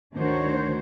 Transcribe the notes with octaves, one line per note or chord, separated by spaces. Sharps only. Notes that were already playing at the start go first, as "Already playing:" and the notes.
D2 D#3 D4 F#4 C5 C#5